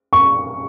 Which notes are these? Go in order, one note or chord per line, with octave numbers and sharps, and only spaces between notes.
C#6